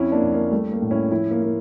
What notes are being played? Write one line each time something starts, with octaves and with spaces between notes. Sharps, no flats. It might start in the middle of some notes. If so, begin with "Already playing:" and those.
Already playing: F2 C#4 E4
A#3 D4
F2
A#3
G3 A3
A#3
A2
C#4 E4
F3 C#4 E4
A#3
A#3